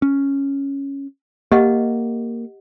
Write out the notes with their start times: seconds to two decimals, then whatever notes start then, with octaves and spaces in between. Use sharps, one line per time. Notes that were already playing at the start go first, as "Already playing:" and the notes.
0.02 C#4
1.52 A#3 G4 D#5 F#5